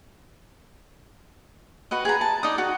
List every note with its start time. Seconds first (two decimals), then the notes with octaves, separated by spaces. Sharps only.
1.91 F#4 B4 D#5
2.05 G#4 B4 G#5 A#5
2.21 A5
2.43 D#4 D5 D#6
2.58 F#4